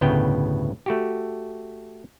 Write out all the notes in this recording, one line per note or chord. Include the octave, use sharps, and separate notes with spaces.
G1 D2 A2 C#3 B3 G5
A3 F#4 G4